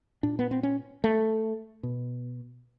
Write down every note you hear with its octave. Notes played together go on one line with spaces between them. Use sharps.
A#2 D4
B3
C4
C#4
A3
B2